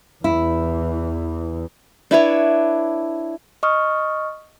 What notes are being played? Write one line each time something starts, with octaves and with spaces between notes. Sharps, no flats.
E2 E3 E4
D4 E4 B4 C#5
D#5 C#6 D#6 F6